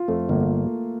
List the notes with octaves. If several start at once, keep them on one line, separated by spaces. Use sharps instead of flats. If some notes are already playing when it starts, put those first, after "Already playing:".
Already playing: F4
F2 A3
G1 A#3